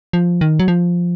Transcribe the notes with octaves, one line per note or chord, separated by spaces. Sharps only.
F3
D#3
F#3
F3